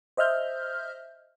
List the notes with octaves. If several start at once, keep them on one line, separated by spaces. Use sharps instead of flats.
C5 D#5 E5 F6 G6